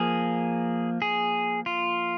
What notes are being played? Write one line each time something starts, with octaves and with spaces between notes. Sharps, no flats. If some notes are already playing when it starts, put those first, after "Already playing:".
Already playing: F3 A#3 G#4
G#4
F4